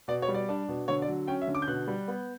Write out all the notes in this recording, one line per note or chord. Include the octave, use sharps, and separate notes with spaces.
B2 D5
C#5
G3
D5
D4
B2
D3 C#5
D5
F#3
C#4 G5
E5
D3
D6
G6
B2 F#6
G3
B3